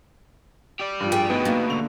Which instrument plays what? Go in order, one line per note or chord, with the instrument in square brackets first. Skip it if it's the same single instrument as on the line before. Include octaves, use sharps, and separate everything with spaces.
[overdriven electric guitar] G4 D5
[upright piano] G2 F3
[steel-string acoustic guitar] G#4 G5
[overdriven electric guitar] D2 B2 [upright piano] B3 D#4
[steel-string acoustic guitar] A#3
[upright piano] D3 F7